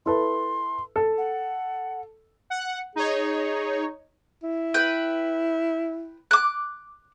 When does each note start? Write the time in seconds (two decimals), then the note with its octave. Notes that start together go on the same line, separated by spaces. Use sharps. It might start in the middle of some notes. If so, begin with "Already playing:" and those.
0.06 E4 A4 B4 C6
0.96 A4
1.18 F#5
2.50 F#5
2.96 D#4 G#4 C#5
4.43 E4
4.74 B4 G5
6.31 D6 F#6